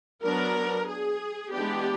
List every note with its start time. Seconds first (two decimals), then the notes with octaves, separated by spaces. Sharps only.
0.23 F#3 B3 D4 A#4
0.87 G#4
1.52 E3 G#3 B3 D4 G4